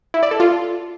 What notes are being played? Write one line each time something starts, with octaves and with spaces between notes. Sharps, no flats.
E4
D5
A4
F4